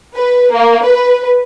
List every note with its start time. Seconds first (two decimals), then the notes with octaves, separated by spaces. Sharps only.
0.16 B4
0.52 A#3
0.83 B4